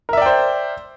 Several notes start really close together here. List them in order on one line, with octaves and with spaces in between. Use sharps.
A#4 E5 D5 G5 C5